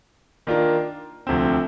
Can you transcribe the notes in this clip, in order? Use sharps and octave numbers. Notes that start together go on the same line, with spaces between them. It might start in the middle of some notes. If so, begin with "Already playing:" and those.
D#3 A#3 D4 F4 A#4
D2 C3 F3 C4